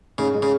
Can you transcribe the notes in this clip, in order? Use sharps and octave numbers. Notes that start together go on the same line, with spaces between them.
G#2 C#3
G#3
C#3